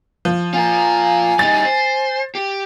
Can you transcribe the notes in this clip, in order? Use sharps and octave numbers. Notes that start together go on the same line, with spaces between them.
F3
F4 A#4 G#5
G3 D#4 A6
C5
G4